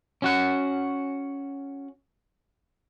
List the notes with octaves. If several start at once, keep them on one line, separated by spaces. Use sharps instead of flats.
C#4 F#4 F#5